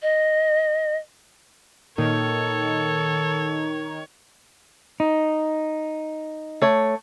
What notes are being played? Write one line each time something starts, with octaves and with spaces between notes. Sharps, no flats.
D#5
A#2 D#3 A4 C#5
D#4
A3 C#5